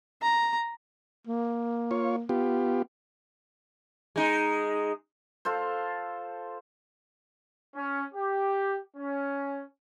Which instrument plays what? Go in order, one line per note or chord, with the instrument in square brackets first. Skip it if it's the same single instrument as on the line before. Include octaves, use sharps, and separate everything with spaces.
[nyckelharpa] A#5
[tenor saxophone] A#3
[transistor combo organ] F4 C#5
B3 F4 G4
[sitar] G#3 D#4
[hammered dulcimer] F4 A4 C5
[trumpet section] C#4
G4
C#4